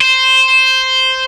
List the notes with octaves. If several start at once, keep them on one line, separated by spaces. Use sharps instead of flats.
C5